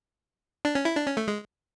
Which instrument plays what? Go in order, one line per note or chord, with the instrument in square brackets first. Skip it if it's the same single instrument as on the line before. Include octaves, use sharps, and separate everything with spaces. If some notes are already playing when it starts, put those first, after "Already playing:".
[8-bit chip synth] D4
C#4
E4
D4
C#4
A3
G#3